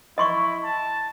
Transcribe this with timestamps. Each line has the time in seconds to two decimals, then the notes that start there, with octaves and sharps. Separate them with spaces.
0.18 E4 D#5 C6 C#6
0.64 A5